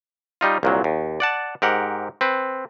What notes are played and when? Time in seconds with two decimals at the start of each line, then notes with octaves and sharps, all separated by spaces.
0.41 G3 D#4 F4
0.63 C2 A#2 F#3
0.84 D#2
1.20 D5 F#5 A5
1.62 G#2 G4 A#4 F#5
2.21 C4 B4